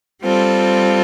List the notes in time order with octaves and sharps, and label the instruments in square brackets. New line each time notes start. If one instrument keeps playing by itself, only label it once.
[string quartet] G3 C4 F4 A4